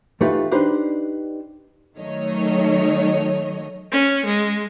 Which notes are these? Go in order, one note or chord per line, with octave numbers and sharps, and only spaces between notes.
E3 A3 D#4 F4 G4 B4
D4 D#4 G4 B4 C5 D5
D#3 F#3 A3 C#5 D#5
C#4
G#3